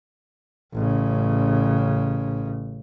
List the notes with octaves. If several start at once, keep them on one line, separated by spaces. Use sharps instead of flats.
A1 C#3